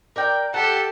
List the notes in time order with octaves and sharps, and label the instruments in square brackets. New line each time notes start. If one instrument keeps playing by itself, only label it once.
[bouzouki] A#4 D5 G5
[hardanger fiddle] G4 A4 [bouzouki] F#5